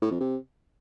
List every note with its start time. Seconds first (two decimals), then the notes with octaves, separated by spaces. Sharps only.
0.02 A2
0.11 F2
0.21 C3